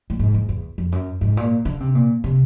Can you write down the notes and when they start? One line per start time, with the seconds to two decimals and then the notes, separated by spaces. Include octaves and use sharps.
0.10 A2
0.19 G#2
0.34 E2
0.49 E2
0.78 F2
0.92 F#2
1.21 G#2
1.37 A#2
1.65 D3
1.80 C3
1.95 A#2
2.24 C3